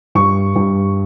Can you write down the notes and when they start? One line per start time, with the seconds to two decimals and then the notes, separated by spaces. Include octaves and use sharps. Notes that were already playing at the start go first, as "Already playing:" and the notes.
0.15 G2 C#6
0.56 G2